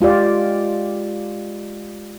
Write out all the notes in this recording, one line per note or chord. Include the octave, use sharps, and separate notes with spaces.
G#3 F4 G4 D5